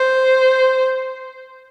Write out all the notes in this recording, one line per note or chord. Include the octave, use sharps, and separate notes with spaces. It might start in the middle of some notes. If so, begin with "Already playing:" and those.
Already playing: C5